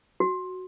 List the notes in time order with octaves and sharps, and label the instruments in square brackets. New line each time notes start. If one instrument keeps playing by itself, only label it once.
[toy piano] F#4